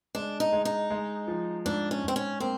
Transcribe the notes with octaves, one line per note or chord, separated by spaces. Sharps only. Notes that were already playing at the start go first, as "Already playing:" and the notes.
G#3 D4
D#4
G#3
D#4
G#3
F3
G#2 D4
C#4
G#2 C4
C#4
A#3 C4